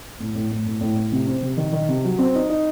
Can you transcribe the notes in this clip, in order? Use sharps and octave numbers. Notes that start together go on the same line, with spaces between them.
A2
A2
A2
A2
A2
A2
C3
C4
C3
D#3
D#3
C3
F#3
C4
D#4
D#4